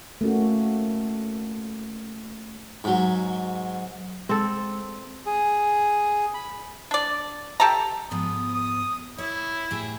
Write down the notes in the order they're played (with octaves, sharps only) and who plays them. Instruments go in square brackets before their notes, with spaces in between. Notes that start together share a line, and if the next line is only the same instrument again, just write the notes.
[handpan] A3 A#3 C#4 F#4
[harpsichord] G#2 F#3
[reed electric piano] G#3 [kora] C4 A4
[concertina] G#4
B5
[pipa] D4 D5
G4 A4 A5 A#5
[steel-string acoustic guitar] G#2 F3 B3 [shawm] D#6
[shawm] D#6
[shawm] E4 [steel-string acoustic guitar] C#5
[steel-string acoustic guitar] A2 G4 G#4